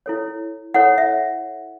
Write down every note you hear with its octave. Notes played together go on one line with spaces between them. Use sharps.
E4 A4 C#5
E4 A4 C#5 F#5
E5